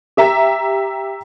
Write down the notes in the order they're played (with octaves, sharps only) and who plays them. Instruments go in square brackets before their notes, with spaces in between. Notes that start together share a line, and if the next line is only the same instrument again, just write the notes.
[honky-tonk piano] G4 E5 A#5